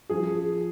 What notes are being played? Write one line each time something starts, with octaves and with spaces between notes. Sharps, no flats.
F3 G#4